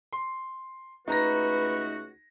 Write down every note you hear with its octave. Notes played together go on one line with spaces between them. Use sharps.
C6
C#2 A3 D#4 F#4 B4 A#5 A#6